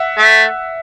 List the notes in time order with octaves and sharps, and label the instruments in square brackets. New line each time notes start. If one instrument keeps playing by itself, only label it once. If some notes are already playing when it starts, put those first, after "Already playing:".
Already playing: [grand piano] E5 F#5
[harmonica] A3